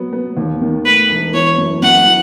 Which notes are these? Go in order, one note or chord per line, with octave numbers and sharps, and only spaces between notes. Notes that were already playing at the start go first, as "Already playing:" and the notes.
Already playing: F#3 B3
B3
D#2
D#3
A3 B4
E1
E3 C#5
F#2
F#2 F#5
E3